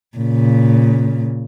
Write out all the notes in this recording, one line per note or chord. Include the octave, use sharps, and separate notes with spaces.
A#2 C#3